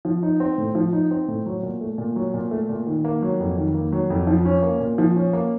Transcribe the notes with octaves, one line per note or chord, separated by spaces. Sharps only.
F3
D#4
C4
A2
F3
D#4
C4
A2
F#3
A#2
A3
A#2
F#3
A#2
A3
A#2
D#3
A#3
F#3
F2
D#3
A#3
F#3
F2
F3
C#4
A#3
A#2
F3
C#4
A#3